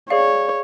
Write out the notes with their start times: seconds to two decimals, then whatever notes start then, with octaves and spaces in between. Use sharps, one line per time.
0.10 G#4 C#5 D5 F5